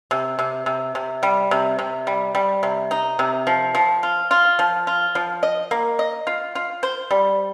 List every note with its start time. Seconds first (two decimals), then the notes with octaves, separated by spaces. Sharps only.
0.11 C3
0.39 C3
0.66 C3
0.95 C3
1.23 G3
1.51 C3
1.79 C3
2.07 G3
2.35 G3
2.63 C3
2.91 D#4
3.19 C3
3.47 F3
3.75 F3
4.03 F4
4.31 F4
4.59 F3
4.87 F4
5.15 F3
5.43 D#5
5.71 A#3
5.99 D#5
6.27 F4
6.55 F4
6.83 C5
7.11 G3